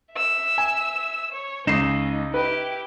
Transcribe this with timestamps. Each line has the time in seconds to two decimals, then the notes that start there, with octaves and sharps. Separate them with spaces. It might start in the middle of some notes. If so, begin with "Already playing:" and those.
0.14 E5 E6
0.58 G#5
1.32 C#5
1.67 C#2 C#4 D#4 C7 E7
2.34 E4 G4 B4